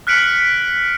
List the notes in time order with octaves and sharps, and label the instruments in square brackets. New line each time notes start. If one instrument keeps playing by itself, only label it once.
[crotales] F6 F#6 B6 C#7 D7 F#7